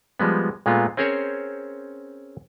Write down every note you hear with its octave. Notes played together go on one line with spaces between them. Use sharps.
F3 G3 G#3 B3
A#2 G#3 A3 B3 F4
C4 C#4 G#4 A#4 C5 C#5